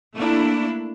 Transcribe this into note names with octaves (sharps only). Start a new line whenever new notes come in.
A3 A#3 D4 E4